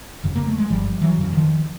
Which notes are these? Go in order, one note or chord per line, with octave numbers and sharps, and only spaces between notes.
F2 C#3
A#3
A3
G#3
G1 F3 G3
E3 F#3
F2 C#3
D#3 F3